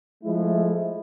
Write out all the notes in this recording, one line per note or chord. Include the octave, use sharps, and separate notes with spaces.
F3 G#3 A3 E4